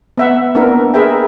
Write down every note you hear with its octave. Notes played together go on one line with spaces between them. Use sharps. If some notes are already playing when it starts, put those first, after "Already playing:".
B3 E5 F#5
A#3 B3 D4 E4 A#4
G#4 A#4 B4 E5 G5